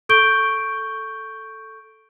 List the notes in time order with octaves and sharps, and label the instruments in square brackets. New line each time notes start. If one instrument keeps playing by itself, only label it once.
[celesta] A4 C#6 G6 D7 G7